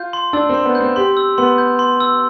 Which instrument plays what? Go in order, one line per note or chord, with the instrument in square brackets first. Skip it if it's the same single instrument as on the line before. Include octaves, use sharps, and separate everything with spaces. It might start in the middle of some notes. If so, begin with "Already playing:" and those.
Already playing: [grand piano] F4 [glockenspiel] G6
[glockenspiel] C6
[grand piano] D4 [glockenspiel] E6
[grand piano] C4 [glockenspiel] C6
[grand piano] B3
[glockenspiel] G6
[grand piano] C4
[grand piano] G4 [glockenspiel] C6
[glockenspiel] E6
[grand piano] B3 [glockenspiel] C6
[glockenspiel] G6
C6
E6